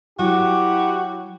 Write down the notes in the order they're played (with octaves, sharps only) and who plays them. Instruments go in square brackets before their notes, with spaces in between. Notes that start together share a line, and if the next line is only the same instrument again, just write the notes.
[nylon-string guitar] F#3 [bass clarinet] E4 [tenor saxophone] F#4 [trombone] G4